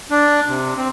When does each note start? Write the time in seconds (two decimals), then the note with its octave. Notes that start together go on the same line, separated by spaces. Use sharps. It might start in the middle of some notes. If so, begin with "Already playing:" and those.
0.11 D4
0.48 C3
0.77 C4